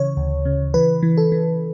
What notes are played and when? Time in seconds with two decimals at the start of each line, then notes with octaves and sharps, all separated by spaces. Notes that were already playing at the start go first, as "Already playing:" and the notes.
Already playing: C#3 E3 C#5
0.17 D2
0.45 C#3
0.74 E3 B4
1.03 E3
1.17 A4
1.32 E3